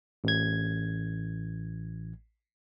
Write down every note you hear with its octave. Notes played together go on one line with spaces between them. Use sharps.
A1 G#6